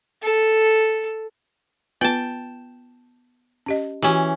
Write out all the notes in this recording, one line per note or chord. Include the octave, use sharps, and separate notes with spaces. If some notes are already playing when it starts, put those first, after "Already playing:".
A4
B3 F4 B4 G5 A5
C#4 G4 D#5
E3 C#4 F#4 G4